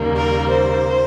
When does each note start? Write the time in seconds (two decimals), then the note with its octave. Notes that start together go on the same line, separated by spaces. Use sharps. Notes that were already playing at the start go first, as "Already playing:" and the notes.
Already playing: D#2 C#3 G3 A#3
0.15 A#4
0.49 C5